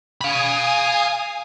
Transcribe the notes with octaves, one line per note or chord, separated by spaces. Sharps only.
F5 G#5 B5 D#6